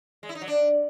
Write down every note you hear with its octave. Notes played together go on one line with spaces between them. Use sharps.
G#3
E4
D#4
F#3
D4